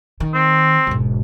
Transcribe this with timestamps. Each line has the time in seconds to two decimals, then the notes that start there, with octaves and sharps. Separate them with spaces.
0.20 D#3
0.34 C4
0.87 E1 G#2